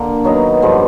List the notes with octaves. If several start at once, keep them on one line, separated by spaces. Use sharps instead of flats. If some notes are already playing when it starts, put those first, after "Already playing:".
Already playing: D3 A#3 D4
D#3 F#3 B3 D#4
G2 D3 F3